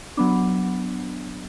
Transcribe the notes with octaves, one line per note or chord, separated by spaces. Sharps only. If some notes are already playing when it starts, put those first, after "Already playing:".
F#3 B3 D4